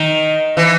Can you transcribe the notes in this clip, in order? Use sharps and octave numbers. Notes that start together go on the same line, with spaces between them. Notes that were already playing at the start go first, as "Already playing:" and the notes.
Already playing: D#3
E3